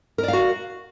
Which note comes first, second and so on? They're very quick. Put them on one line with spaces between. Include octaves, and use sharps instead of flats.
A#4 D5 F5 F#4